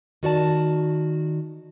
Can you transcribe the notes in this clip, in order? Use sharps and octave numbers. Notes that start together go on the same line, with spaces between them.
D#3 F#4 D5 A5